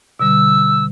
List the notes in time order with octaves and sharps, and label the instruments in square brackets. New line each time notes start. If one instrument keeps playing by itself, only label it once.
[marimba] B2 D3 G3 [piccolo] E6